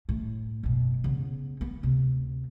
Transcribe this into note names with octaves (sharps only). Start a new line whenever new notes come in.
A2
F#2 B2
C#3 B3
B3
D2 C3